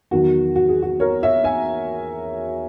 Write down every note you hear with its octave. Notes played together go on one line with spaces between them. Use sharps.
E2 D#3 F#3 F#4
F#4
G#4
F#4
A#4 C#5
C#5 E5
E5 G#5